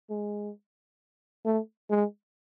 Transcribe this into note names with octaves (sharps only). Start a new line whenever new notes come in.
G#3
A3
G#3